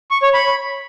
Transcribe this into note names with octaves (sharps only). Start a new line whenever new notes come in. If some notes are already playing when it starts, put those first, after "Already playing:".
C#6
C#5
B5